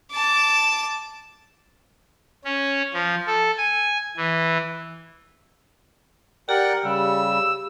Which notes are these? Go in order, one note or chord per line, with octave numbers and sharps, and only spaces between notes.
A5 D6
C#4
F3
A4
G#5
E3
G4 A#4 D5 F#5 G5
C#3 G3 E6